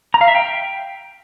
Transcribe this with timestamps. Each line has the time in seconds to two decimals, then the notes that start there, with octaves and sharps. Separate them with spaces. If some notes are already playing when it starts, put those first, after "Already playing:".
0.14 A#5
0.21 F5
0.28 E5
0.35 G5